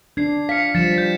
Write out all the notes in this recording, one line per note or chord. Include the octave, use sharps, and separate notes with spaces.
D4 G#6 C7
F5 B6 C#7
F3 G3 A6 C#7 E7
G6 B6